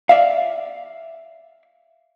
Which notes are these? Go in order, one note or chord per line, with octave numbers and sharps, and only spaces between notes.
D5 E5 F5